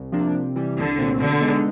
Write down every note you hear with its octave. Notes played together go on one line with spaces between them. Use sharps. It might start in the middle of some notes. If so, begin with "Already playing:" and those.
Already playing: C2
C3 F3 A#3 D4
C3
E3 G3
C2 D3
A#2 F#3 A3 C4
B2 D3
G#3 B3 D#4